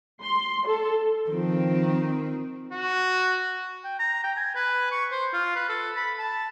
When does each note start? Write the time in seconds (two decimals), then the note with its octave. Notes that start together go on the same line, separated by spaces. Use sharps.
0.22 C6
0.67 A4
1.30 D#3 F3 C4
2.73 F#4
3.84 G5
3.99 A#5
4.24 G5
4.36 G#5
4.55 B4
4.92 C#6
5.11 C5
5.33 F4
5.56 B4
5.69 A4
5.96 B5
6.19 A5